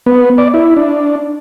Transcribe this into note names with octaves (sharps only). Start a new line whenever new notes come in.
B3
D5
E4
D4